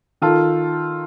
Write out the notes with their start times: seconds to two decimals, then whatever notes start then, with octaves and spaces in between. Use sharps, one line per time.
0.22 D#3 F4 A4